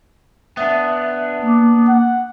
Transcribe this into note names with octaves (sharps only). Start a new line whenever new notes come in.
B3 D4 E5
A#3 D6
F#5